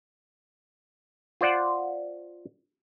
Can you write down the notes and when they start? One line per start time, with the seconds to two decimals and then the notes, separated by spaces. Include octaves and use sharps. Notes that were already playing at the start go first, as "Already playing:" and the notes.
1.41 F4 C5 D5 F#5